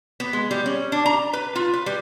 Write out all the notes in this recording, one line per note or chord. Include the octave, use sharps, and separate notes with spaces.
B3
G#3
G3
C#4
D4
A#5
B4
F4
B4
G3